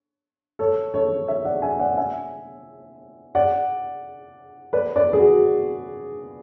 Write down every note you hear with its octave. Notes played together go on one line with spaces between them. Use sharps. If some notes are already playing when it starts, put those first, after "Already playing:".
A4 C#5
A4 C#5
C#5 E5
D5 F#5
E5 G#5
D5 F#5
E5 G#5
D5 F#5
B4 D5
B4 D5
G#4
F#4